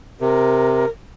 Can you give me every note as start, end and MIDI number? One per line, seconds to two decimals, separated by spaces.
0.21 0.85 48
0.21 0.90 70